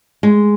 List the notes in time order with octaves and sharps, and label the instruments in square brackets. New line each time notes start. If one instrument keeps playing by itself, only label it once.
[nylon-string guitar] G#3